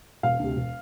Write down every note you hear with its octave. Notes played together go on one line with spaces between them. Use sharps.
E1 F5
D2 C3
E1